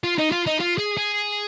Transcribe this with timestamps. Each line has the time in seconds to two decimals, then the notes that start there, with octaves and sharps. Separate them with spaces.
0.04 F4
0.18 D#4
0.32 F4
0.47 D#4
0.60 F4
0.78 G#4
0.97 G#4